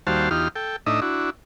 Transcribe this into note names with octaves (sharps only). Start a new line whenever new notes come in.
D#2 G3 F#4 C5 F5 A5
E2 D#4 F4 G4 F6
A4 G5
A2 D4 D#4 D#5 E5
D4 E4 F#4